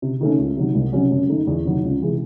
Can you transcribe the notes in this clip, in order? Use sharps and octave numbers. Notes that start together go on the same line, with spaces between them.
C3
D#3 A3 C#4
C#2
C3 D#3 F#3
C2
C3 F#3 C#4
F#2
D#3 A3 D#4
E2
C3 D#3 F#3
C#2
C3 E3 G#3